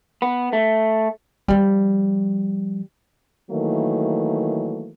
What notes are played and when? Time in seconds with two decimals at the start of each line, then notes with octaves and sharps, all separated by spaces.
0.22 B3
0.53 A3
1.48 F3 G3
3.51 D#3 E3 F#3 A3 A#3